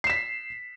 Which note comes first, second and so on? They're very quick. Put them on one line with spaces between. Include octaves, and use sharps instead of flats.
C7 E7 B6